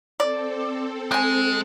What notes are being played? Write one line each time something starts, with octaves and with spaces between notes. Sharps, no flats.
C4 A4 D5
G#3 G5 G#5